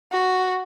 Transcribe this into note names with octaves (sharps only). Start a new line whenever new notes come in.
F#4